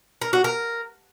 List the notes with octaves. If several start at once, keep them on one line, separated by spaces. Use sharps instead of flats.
A#4
F#4
A#4